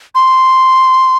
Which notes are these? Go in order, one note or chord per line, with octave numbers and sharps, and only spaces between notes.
C6